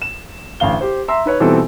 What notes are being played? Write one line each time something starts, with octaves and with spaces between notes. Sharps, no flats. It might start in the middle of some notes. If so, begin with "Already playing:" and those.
E7
A1 D2 F5 G7
G4 C5
E5 A#5 C6 E6
D#4 B4 C#5
B2 E3 G3 C4 D#4 A4